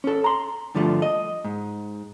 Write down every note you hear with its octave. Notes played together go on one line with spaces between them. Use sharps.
C#4 A4
A#5 C6
G2 D3 F3 A3
D#5
G#2